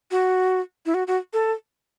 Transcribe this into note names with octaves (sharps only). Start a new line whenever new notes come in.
F#4
E4
F#4
F#4
A4